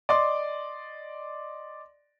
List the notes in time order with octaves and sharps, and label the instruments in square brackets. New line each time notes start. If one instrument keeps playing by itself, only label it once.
[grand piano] D5 D#5 C6 D6